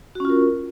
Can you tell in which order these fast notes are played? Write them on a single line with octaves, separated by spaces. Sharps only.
F#4 C#4 F4 A#4